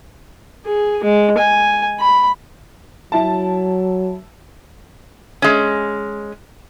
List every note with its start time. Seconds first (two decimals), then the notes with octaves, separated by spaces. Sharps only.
0.66 G#4
1.04 G#3
1.38 G#5
2.00 B5
3.12 F#3 E4 A5
5.42 G#3 C#4